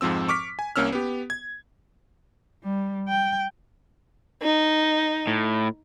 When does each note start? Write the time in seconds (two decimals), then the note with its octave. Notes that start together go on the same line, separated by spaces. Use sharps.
0.01 F2 G#2 F3 C4 E6
0.28 C#6 D6 F6 B6
0.59 G#5
0.76 C2 A#3 C#4 E6 F6
0.92 B3 G4
1.30 G#6
2.63 G3
3.09 G5
4.43 D#4
5.27 A2